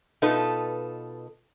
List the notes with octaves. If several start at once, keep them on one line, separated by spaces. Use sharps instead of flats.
B2 D#4 F4 A4 B4